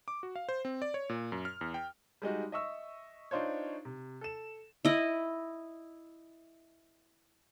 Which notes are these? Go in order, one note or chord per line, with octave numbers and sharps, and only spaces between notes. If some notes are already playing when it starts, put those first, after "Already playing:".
D6
F#4
F5
C5
C4
D5
C#5
A#2
F#2
F6
E2
G5
G3 G#3 D#4 F#4
D#5 E5 C#6 E6
D4 D#4 F4 C5 C#5
C3
A4 E7
E4 D#5